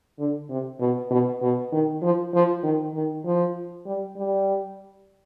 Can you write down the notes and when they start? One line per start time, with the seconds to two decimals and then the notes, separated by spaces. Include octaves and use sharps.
0.19 D3
0.49 C3
0.80 B2
1.10 B2
1.42 B2
1.72 D#3
2.02 F3
2.33 F3
2.63 D#3
2.94 D#3
3.25 F3
3.86 G3
4.17 G3